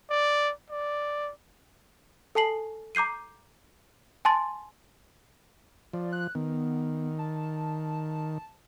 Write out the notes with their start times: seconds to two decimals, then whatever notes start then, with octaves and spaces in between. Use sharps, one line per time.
0.10 D5
0.70 D5
2.35 A4 G#5 A5 C7 F#7
2.95 A#5 D6 G6 C7 D#7
4.25 G#5 A5 C6 A6
5.93 F3 D5
6.13 F#6
6.35 D#3 B3
7.19 A5